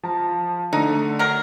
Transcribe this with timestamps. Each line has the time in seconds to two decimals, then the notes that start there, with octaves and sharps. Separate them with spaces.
0.03 F3 A5 A#5
0.73 D3 A3 D#4
1.19 F#3 A#4